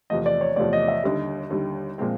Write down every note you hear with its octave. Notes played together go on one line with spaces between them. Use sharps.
E2 C3 F3 A3 D#5
D5
C#5
E2 C3 F3 A3 D5
D#5
E5
D#2 D3 G3 D#5
D#2 D3 G3
A#2 F3 G#3 C4